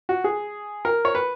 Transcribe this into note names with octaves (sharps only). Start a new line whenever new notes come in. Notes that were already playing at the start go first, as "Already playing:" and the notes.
F#4
G#4
A#4
C#5
B4